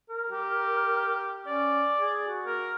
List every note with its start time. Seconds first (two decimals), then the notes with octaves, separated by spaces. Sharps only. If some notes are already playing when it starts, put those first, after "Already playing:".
0.10 A#4
0.31 G4
1.47 C#4 D5
1.99 G#4
2.28 F#4
2.47 A#4